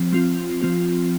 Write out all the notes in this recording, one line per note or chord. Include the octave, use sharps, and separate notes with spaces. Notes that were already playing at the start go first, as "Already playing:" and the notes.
Already playing: F3 C4
F3 C4 F4
F3 C4 F4